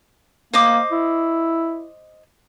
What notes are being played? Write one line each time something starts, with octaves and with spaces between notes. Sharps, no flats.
A#3 C5 D#5 D6
E4